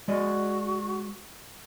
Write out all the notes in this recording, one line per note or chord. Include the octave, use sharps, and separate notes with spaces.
G#3 F#4 D5 D#5